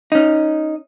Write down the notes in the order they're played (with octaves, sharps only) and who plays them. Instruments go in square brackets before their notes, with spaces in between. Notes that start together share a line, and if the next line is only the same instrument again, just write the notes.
[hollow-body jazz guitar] C#4 D#4